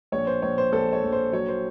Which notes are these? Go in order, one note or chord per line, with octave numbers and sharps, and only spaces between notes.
A#1 C#5
C5
A#1 C#5
C5
A#1 A4
C#5
A#1
C5
F#3 C#5
C5